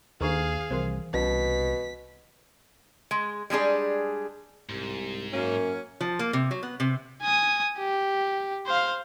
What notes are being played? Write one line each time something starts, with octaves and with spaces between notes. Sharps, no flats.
D#2 D#3 D4 G#4 A4 F5
C2 E3 A#4 C5
C2 B2 C#4 B6
G#3
G3 G#3 D4 G#4
C2 G#2
F#2 F#3 A#3 C#4
F3
A#3
C3
F#3
B3
C3
G#5 D#6
G4
C5 F5